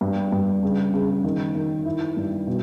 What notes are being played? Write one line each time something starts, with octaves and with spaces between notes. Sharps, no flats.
G2
G2
C#3
C#3
D#3
D#3
E4
G2
B2